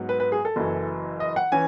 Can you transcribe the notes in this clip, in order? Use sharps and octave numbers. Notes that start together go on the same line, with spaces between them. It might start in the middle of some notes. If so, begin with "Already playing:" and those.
Already playing: G#2 F#3 B3
B4
B4
G#4
A4
F#1 F#2 E3
D#5
F#5
E3 C#4 G#5